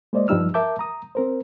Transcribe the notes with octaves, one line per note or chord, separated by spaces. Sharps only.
G#3 A#3 C5 D5 D#5
G2 F3 G3 D#4 E6 F6
A#4 E5 A5 D6 G6
A#5 D#6
C4 A#4 C5